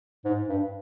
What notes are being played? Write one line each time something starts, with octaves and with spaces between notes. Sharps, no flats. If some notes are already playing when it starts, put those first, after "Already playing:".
G#2
G2